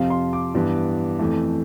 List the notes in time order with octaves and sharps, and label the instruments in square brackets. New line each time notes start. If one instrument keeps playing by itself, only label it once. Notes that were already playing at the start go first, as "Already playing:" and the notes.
Already playing: [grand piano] F2 C3 F3 F5
C6
D6
G2 E3 B3
F2 E3 A3